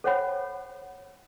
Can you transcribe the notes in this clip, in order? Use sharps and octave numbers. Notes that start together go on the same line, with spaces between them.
A4 C5 C#5 F#5 G5 B5